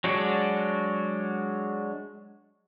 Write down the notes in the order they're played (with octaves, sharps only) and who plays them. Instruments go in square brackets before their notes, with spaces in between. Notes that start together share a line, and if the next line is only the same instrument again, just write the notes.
[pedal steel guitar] F#3 G#3 D4 F#4